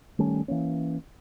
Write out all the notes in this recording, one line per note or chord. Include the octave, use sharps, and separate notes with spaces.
D#3 G3 A3 C#4
E3 A#3 C#4